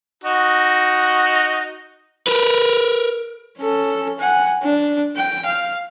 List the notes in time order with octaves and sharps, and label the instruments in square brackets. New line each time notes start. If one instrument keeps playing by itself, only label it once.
[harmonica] D#4 F#4
[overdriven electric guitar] A#4 B4
[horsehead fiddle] C#4 A4
F#5 G#5
D4
G5
F5